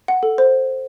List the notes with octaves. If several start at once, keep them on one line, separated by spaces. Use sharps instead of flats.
F#5
A4
C5